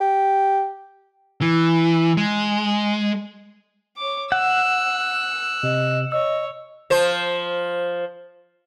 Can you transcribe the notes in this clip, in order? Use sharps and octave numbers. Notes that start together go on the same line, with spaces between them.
G4
E3
G#3
C#5 D6
F#5 E6 F#6
C3 D#5
C#5 D#5 E6
F3 C5